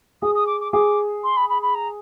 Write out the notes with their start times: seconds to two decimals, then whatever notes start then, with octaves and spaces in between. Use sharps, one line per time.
0.22 G#4 D#6
0.35 D#6
0.47 D6
0.61 D6
0.72 G#4 D6
1.24 C6
1.37 B5
1.49 B5
1.62 B5
1.75 A#5